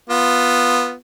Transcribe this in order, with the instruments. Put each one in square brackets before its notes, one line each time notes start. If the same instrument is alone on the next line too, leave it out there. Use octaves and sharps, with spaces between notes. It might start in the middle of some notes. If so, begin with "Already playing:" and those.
[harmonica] B3 F4